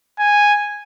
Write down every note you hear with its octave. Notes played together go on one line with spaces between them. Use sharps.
G#5